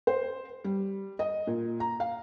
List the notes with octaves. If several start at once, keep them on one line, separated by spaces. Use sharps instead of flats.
C5
G3
D#5
A#2
A#5
F5